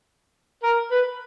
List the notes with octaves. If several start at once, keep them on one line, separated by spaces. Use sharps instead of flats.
A#4
B4